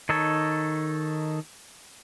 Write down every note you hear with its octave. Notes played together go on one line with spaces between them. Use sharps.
D#3 D#4 A4 C#5